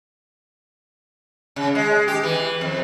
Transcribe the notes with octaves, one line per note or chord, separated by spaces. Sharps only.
C#3
G#3
G4
E3
F2